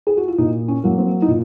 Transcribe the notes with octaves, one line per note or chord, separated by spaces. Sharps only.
G#4
F#4
F4
A#2 D#4
C#4
F#3 A#3
C4
D#4
A#2 F4